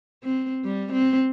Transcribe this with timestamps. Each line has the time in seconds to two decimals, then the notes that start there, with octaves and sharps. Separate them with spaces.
0.24 C4
0.64 G3
0.93 C4